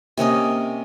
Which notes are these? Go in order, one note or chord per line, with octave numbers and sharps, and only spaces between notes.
C3 A#3 C#4 D#5